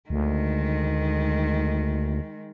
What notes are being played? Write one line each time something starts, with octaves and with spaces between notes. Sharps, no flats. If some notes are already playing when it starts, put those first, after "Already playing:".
D2 D#3 G#3